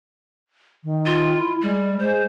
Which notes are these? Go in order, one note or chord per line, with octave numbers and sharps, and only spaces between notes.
D#3
F4
E4
G3 G#3
G#3 C5